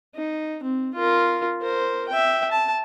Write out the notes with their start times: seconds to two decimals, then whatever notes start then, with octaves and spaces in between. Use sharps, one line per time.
0.15 D#4
0.63 C4
0.95 F4 A#4
1.62 A#4 C5
2.09 E5 G5
2.52 A5